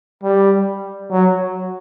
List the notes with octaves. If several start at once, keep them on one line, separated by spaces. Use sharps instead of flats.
G3
F#3